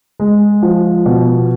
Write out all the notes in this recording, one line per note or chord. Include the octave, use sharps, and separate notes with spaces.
G#3
F3
B2